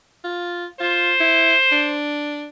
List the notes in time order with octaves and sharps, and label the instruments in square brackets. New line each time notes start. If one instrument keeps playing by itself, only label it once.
[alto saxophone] F4
[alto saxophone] F4 [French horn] C5
[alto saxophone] E4
D4